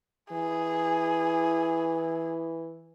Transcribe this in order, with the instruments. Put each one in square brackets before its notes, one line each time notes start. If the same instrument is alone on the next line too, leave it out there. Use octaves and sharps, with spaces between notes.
[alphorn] E3 [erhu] G#4